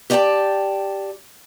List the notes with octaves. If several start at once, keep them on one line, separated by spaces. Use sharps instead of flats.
G4 D5 D#5 F5 G5 A5